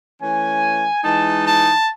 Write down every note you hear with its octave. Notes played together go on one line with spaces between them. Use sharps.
E3 A3 C#4 G#5
E3 G#3 D#4 A5
A5